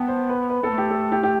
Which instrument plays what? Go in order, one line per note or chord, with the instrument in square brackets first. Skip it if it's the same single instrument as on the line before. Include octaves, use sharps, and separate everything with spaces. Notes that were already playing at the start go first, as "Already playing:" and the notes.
Already playing: [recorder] B3 [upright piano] G5 A5
[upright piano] C5
B4
B4
[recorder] B3 [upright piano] A4
[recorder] A3
[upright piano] G4
A4
G4
G4